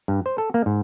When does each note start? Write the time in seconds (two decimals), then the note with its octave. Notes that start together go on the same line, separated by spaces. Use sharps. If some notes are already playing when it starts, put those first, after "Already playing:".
0.08 G2
0.26 C5
0.38 A4
0.54 A#3
0.66 G#2